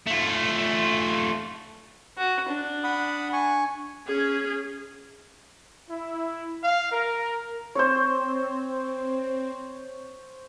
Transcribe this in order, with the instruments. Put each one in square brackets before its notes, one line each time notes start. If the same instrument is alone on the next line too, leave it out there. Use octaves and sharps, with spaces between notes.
[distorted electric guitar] A3 F4
[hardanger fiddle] F#4
D4
[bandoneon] F#5 B5 D#6
G#5 C#6
[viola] C#4 G#4
[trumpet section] E4
F5
A#4
[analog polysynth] C4 [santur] C5 C#5